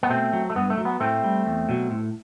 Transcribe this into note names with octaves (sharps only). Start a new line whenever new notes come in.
B3
B2 A3 C4
F#3
A3
G2 B3
A3
F#3
B3
A2 A3 C4
G3
E2
B2 F#3
A2